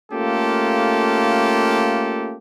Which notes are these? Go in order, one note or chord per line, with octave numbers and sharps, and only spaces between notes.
A3 A#3 C#4 F4 G4 A4